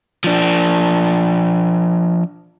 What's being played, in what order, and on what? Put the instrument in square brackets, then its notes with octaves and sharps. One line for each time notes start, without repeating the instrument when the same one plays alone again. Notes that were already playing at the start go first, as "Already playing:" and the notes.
[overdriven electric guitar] F3 D4